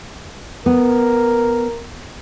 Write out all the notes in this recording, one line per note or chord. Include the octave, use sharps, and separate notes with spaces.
B3 A#4